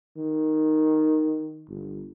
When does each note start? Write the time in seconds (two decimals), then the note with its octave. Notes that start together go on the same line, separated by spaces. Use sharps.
0.17 D#3
1.69 G1